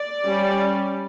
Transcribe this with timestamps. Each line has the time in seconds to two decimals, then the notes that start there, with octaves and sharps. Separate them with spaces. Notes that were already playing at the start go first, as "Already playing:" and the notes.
Already playing: D5
0.25 G3 C#4